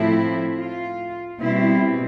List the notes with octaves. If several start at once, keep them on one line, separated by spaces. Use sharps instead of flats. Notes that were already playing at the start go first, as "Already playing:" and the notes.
Already playing: A2 F3 A3 C4 E4
F4
B2 G3 C4 E4